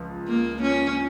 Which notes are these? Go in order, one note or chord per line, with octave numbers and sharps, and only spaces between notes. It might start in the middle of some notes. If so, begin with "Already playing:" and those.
Already playing: C#2 F3
A#3
C#4